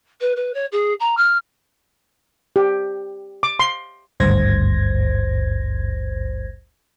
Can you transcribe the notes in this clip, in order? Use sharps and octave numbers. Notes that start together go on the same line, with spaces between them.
B4
B4
C#5
G#4
A#5
F6
G4
D6
C6
G#1 D2 G2 C5 G#6 A#6